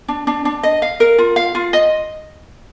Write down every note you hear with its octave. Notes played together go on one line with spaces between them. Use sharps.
D4
D4
D4
D#5
F5
A#4
F4
F5
F4
D#5